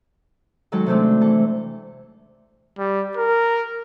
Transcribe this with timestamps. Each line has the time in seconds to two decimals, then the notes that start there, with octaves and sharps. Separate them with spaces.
0.72 D#3 F#3 G#3 A4 C#5 A5
0.86 C3 D#3 G#3 A3 C4 D4
1.21 E3 A4
2.78 G3
3.17 A#4